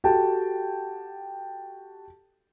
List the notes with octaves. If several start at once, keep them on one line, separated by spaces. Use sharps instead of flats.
F#4 G4 A4 G5 A5